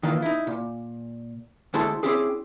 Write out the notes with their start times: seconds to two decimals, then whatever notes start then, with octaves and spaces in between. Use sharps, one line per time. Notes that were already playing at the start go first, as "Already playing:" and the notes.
0.03 D#3 E3 A#3 F4
0.22 D#4 E4
0.47 A#2
1.74 D2 G#3 E4 A4 C5 A5
2.03 C4 C#4 E4 G4 G#4